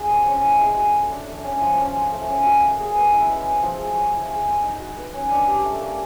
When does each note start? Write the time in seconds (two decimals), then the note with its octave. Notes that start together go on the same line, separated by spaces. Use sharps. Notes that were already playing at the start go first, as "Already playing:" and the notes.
Already playing: D4 F4 G#4
0.09 C4
0.27 C#4
0.44 E4
0.61 G#3
0.77 F#4
0.94 A4
1.10 D4
1.28 A3
1.44 C#4
1.61 F3
1.78 C#4
1.95 F4
2.12 A3
2.28 C#4
2.45 F#4
2.62 A#3
2.79 G#4
2.95 B4
3.12 E4
3.29 G#3
3.46 C4
3.62 F3
3.79 G#4
3.96 C#5
4.13 E4
4.30 G#4
4.46 C5
4.63 D#4
4.80 F#4
4.97 B4
5.14 C#4
5.31 D4
5.48 G4
5.64 A3
5.81 A#3